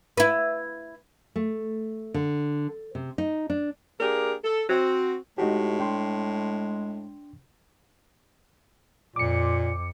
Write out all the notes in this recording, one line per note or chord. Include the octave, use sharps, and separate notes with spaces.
E4 B4
A3
D3
C3
D#4
D4
A#3 D4 G4 G#4 A#4
A4
C4 F#4
A2 G#3 D#4 F#4 G4
D4 G5 C6
F2 A#2 D6 C#7